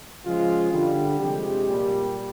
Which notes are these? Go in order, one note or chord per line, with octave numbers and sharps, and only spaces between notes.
C#3 F3 G#3 F4
D3 G3 G4
C3 F3 G#3 G4
A#2 G3